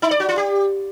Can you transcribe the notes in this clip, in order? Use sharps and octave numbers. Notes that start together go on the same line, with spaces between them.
D#4
D5
F#4
F4
G4